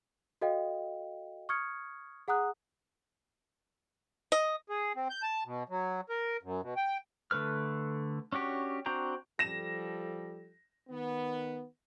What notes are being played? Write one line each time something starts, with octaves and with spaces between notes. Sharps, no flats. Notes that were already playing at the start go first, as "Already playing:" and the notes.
F#4 A4 D#5 F5 G5
C#6 D#6 F6 G#6 C#7
G#4 F#5 A#5 D#6 F#6
D#5
G#4
C4
G6
A5
B2
F#3
A#4
F#2
B2
G5
D3 A3 B4 F6
C#4 D4 F#4 G4
C4 D4 F#4 G5 A#5
F3 G3 A4 A#6 E7
D#3 B3